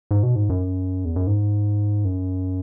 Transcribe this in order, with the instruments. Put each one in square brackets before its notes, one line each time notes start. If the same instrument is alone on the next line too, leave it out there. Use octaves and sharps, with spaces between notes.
[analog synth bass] G#2
B2
G#2
F#2
E2
F#2
G#2
F#2